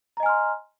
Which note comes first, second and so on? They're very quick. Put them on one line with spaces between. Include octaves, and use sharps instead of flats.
A#5 D#5 G#5 F6 C6